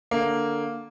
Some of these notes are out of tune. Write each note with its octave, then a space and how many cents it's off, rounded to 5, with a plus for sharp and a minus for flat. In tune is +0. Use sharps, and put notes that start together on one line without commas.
D3 +0 A#3 +0